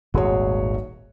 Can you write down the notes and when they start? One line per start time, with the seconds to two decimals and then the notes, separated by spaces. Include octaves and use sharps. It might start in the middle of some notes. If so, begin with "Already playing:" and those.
0.14 D#1 G#1 B2 F#4 G#4 C#5